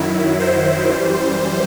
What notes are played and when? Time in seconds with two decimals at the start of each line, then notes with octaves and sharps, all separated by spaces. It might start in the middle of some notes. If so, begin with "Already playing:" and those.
Already playing: F#2 D#3 F#3 E4
0.40 C5
0.89 F#2 E3 G3